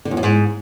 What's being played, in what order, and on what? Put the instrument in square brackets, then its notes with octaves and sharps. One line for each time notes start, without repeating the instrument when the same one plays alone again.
[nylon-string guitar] D3
E2
F#2
G#2